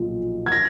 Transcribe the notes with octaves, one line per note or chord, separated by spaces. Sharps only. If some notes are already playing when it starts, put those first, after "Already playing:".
Already playing: B1 A#2 F3
G#6
A#6